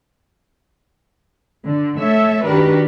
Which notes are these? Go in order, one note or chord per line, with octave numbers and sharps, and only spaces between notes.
D3
A3 A4 C#5 E5
D#3 D4 F#4 G4 A#4 B4